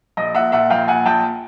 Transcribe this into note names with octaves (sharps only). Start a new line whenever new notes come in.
A#1 D#5
A#2 E5 F#5
A#2 E5 F#5
A#1 F5 G5
A#2 F#5 G#5
A#1 G5 A5